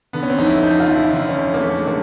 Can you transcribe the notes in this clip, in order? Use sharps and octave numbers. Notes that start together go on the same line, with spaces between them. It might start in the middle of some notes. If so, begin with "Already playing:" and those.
D3 B3
C#4
C4
F2 D#4
E4
F2 D#4
F4
F2
E4
D3 D#4
C#4
F2
A#3
F2 A3
G#3
D3 A#3